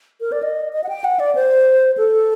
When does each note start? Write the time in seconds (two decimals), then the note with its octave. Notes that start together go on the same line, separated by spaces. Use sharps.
0.21 A#4
0.32 D5
0.43 D#5
0.73 D#5
0.84 F#5
0.89 G5
1.04 F#5
1.19 D5
1.35 C5
1.98 A4